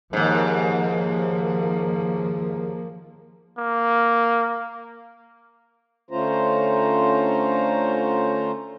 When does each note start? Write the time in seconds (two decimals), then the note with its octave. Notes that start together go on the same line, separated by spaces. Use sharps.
0.13 D#2 G#2 F3 A#3
3.58 A#3
6.11 D3 A3 C#4 F4 C5 A#5